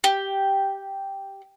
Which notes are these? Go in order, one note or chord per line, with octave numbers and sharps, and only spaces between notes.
G4